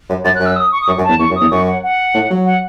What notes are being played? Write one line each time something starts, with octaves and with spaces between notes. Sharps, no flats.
F#2
F#2 A6
F#6
F#2
E6
D#6
C#6
D#6
F#2 C#6
F#2
A5
E2
E2 C#6
F#2
E2 D#6
F#2 C#6
F#5
F#5
A2
F#3
F#5